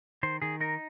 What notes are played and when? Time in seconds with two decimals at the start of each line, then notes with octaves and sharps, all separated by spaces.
0.23 D#3 C5
0.42 D#3 G#4
0.61 D#4 A#4